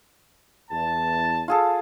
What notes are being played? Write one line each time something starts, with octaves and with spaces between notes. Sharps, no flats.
E2 A5
F4 G#4 A4